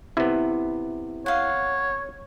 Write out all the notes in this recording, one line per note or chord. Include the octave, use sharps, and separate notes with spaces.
C3 B3 E4
C#5 F5 F#5